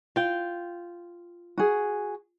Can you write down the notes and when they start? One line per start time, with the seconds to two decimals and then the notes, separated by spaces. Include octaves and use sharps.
0.16 F4 G5
1.58 F#4 G#4